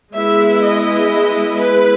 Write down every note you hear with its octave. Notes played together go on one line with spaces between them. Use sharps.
G#3 B3 E4 E5
D#5
B4